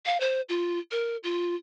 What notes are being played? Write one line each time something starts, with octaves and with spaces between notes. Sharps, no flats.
F5
C5
F4
A#4
F4